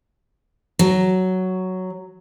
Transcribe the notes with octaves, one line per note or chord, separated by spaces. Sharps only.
F#3